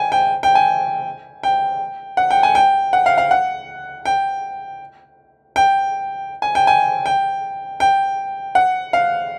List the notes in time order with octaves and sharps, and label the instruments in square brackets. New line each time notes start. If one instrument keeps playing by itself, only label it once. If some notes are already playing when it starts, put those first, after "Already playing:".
Already playing: [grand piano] G5 G#5
G5
G5
G#5
G5
F#5
G5
G#5
G5
F#5
F5
F5
F#5
G5
G5
G#5
G5
G#5
G5
G5
F#5
F5